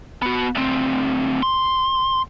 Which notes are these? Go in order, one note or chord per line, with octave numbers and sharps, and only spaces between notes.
B3 F#4
D2 C4
C6